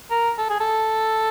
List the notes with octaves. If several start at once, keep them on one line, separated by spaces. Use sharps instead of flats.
A#4
A4
G#4
A4